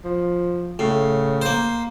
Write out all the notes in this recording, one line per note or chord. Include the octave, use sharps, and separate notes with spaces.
F3
A2 C#3
A#3 C5